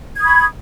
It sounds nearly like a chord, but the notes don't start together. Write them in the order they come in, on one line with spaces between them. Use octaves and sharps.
G#6 D#6 B5 C#6